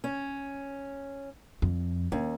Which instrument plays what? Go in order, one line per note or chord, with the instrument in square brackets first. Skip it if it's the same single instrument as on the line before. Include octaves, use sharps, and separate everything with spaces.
[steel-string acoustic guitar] C#4
[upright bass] F2
[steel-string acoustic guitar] D#2 [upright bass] C#4